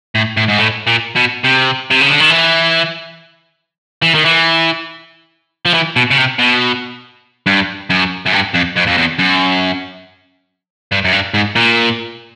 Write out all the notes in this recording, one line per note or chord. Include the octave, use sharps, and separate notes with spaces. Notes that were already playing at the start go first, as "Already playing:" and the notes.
A2
A2
G#2
A2
A#2
B2
C3
C3
C#3
D3
D#3
E3
E3
D#3
E3
F3
E3
B2
C#3
C3
B2
G2
F#2
F#2
G2
F2
F2
F2
E2
F#2
G2
F#2
G2
G#2
A#2